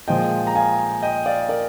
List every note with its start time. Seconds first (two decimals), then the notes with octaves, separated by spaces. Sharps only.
0.08 A#2 F3 G#3 D#5 G5
0.47 A#5
0.55 F5 G#5
1.02 D#5 G5
1.26 D5 F5
1.49 A#4 D5